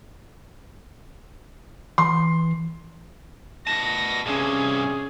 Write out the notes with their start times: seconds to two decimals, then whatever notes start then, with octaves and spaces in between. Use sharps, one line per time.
1.98 E3 C6
3.67 B3 A5 A#6
4.26 G2 C3 C#4 G#4